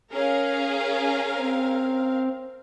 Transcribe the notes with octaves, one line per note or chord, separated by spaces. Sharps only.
C#4 G#4 A#4 F5
C4